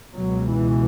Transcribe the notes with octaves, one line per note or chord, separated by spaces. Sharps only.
C#2 B2 F#3
E3